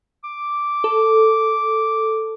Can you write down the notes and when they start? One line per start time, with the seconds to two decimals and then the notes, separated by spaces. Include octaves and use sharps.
0.24 D6
0.84 A4